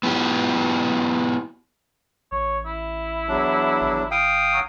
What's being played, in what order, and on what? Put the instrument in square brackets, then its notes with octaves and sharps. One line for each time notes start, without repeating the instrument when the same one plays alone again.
[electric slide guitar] B3 E4 F#4 G4
[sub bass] A1 [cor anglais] C#5
[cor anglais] E4
[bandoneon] E2 F#3 D4
[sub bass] G#1
[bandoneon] F5 G5 D#6
[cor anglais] F#3